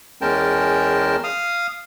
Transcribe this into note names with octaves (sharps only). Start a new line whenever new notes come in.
E2 G#3 C#4 A#4 G5 A5
F5 D#6 F6